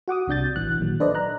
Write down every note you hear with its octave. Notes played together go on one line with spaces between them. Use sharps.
F#4 F#5 D6 D#6
C2 C3 D4 G6 A6
A1 E3 F#6
A#2 D#3 F#3
D4 A4 B4 C5 D5 D#5
A#5 F#6